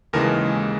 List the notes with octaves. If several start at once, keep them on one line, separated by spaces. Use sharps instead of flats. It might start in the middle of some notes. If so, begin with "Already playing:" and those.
D#2 C#3 E3 G#3 A#4